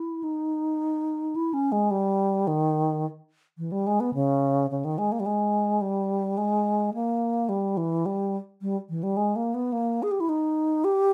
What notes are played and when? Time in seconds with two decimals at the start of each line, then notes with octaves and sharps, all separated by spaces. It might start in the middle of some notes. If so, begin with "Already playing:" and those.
Already playing: E4
0.23 D#4
1.36 E4
1.54 C#4
1.72 G#3
1.91 G3
2.47 D#3
3.58 E3
3.72 G3
3.87 G#3
4.00 B3
4.14 C#3
4.71 C#3
4.85 D#3
4.98 G#3
5.12 A#3
5.20 G3
5.26 G#3
5.81 G3
6.38 G#3
6.94 A#3
7.49 G3
7.77 E3
8.06 G3
8.62 G3
8.90 E3
9.03 G3
9.17 G#3
9.36 A#3
9.54 B3
9.72 A#3
10.03 G#4
10.11 G4
10.20 E4
10.29 D#4
10.84 G4